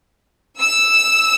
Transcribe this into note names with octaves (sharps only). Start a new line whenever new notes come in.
E6